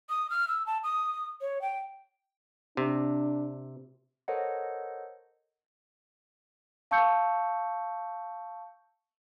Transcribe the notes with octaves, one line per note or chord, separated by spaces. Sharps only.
D#6
F6
E6
A5
D#6
C#5
G5
C3 D4
A4 A#4 C5 C#5 D#5 F#5
F5 A5 C#6 E6 G6 C#7